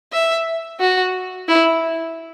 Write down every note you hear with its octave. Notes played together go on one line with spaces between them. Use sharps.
E5
F#4
E4